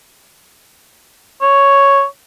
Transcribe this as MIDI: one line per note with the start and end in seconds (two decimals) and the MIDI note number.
1.42 2.04 73